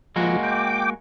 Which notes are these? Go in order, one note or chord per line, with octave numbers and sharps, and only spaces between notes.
F3 G#3 A#3 F#4
G5 D6